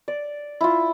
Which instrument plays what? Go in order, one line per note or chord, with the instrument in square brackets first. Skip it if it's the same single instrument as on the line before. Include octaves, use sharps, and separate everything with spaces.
[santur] D5
E4 F4